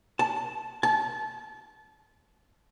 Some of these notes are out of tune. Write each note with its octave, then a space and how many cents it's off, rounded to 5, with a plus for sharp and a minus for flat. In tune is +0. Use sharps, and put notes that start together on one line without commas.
A5 -15
A5 -30